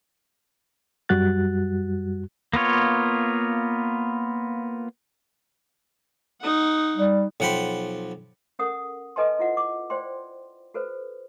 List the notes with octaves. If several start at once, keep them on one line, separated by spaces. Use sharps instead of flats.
F#2 G3 F#4 F#6 A6
A#3 B3 F4 C#5
D#4 F#5
G3
B1 F3 F#5 G5 B5 C6
C#4 A4 A#4 F#5 D#6
A4 B4 D#5 G#5 A5 C6
E4 F4 F#5
D6
C5 D5 G5 C6
F#4 A4 B4 C5